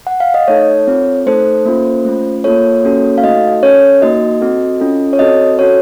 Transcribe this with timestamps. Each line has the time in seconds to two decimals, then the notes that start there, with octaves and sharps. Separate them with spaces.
0.07 F#5
0.20 F5
0.34 D#5
0.48 A3 D#4 A4 C#5
0.87 C4 F4 A4
1.26 A3 D#4 A4 C5
1.65 A#3 C#4 F4 A4
2.05 A3 C#4 F4
2.44 A#3 F4 A4 C#5
2.84 A#3 C#4 F#4 A4
3.18 F5
3.23 A3 D#4 F#4 A4 D#5
3.63 C#4 A4 C#5
4.02 A#3 D#4 F#4 D#5
4.40 C4 F#4 A4
4.80 C#4 F4 A4
5.13 C#5
5.19 C4 F#4 A4 D#5
5.58 C#4 F#4 A4 C#5